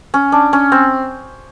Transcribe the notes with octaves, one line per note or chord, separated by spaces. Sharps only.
C#4
D4
C#4
C4